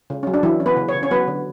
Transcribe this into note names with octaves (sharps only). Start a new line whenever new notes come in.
C#3
F#3 C#4
D4
E3 F#3 E4
C#4
B3 B4
C#3
C#5
C#3
C#4 C#5
F#3 B3 B4
D3